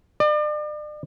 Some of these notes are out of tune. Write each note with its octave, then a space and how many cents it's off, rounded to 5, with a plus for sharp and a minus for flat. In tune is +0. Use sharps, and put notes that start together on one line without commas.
D5 +40